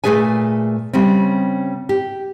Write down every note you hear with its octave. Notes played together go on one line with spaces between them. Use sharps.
A#2 F3 A3 G#4 B4 G#5
C#3 G3 C4
G4